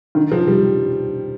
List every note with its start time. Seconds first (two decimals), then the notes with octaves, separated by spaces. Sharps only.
0.15 D#3
0.32 F3
0.48 G3